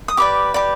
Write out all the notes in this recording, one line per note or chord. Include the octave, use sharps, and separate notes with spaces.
D#6
G4 B4 D5 D6
G4 B4 D5